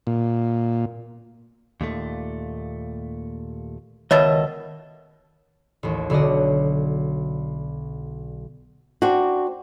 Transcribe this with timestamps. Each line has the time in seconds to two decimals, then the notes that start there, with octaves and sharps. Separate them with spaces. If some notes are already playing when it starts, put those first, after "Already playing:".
0.07 A#2
1.81 D#2 A#2 A3
4.11 C#2 B2 D#3 A4 C#5 D#5 E5 A6
5.83 A1 D#2
6.10 B1 D3 F#4 D5 D#5
9.02 C4 D4 F#4